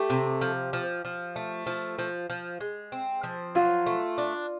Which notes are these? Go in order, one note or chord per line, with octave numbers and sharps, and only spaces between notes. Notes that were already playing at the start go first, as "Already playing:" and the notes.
Already playing: A3 G4
C3
F3
F3
F3
A3
F3
F3
F3
G#3
C4
F3
F#3 F4
A3
D4